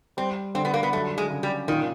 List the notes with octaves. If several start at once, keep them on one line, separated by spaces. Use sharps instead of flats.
G3 C4
D3 C4
B3
A#3
B3
F#3 A3
G#3
C#3
G3
A#2 D#3